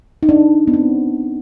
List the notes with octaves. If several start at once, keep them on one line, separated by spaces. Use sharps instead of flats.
D#4
D4
B3
C4